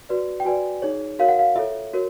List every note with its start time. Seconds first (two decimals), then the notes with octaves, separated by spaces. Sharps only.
0.09 F#4 B4 D5
0.40 G5
0.45 F#4 B4 D5 G#5
0.82 D#4 G#4 C#5
1.19 F#4 A#4 C#5 F5
1.29 F#5
1.39 F5
1.56 F4 A4 C#5 E5
1.93 F#4 A#4 C#5